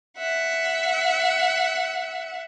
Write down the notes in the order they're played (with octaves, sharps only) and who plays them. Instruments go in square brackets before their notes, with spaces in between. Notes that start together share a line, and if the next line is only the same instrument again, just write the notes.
[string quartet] E5 F#5